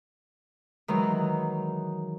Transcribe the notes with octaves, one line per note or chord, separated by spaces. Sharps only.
D#3 E3 F#3 G#3